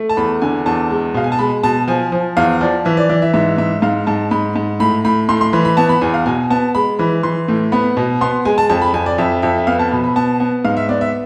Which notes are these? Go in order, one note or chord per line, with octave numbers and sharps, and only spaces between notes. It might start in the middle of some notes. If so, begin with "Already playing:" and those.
Already playing: A3
A5
E2 B5
D3 G#5
E2 A5
G#3
B2 F5
G#5
A5
G#3 B5
B2 A5
F3 G#5
F3
E2 F5
F3 D5
E3 E5
D5
E3 D5
E5
G#2 E5
G#2 E5
G#2 F5
G#2 A5
G#2 B5
G#2
A2 B5
A2 B5
A2 C6
C6
E3 B5
B5
B3 A5
B5
E2 G#5
F5
B2 G#5
B3 A5
G#3 B5
E3 B5
E3 C6
A2
B3 B5
B2
B3 C6
G#3 G#5
A5
F2 A5
B5
F2 G#5
D5
F2 E5
F2 E5
E5
B3 F5
A5
B2 B5
B5
B3 A5
B3
G#2 F5
E5
B3 D5
E5